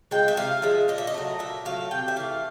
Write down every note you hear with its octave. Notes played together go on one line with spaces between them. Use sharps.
F3 G#3 G5
E5
C3 F5
F3 G#3 E5
A#2 D#5
E5
D#5
F#3 A3
A#2 E5
F#3 A3 F5
C3 G5
E5
E3 A3 F5